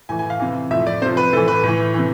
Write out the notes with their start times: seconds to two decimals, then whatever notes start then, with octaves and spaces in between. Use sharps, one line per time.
0.09 A2 E3 G#5
0.19 G#5
0.30 F5
0.40 C3 E3
0.71 A2 F3 E5
0.87 D5
1.01 C3 C5
1.06 F3
1.17 B4
1.33 A2 A4
1.37 E3
1.48 B4
1.63 A2 E3
1.94 C3 E3